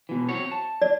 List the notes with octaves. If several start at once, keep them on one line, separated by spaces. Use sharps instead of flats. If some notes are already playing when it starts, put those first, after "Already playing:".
B2 E3
C4 F#4 C#5
A5
D5